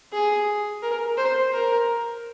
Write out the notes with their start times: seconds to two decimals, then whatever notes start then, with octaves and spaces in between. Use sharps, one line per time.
0.13 G#4
0.83 A#4
1.17 C5
1.53 A#4